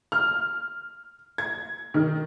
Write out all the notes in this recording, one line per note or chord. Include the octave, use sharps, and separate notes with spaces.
F6
G#6
D#3